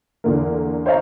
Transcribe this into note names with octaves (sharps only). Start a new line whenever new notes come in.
E2 D3 A#3
C5 C#5 D#5 F5 A#5